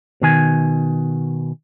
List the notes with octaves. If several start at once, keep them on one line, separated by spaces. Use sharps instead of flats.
B2 D#3 G#5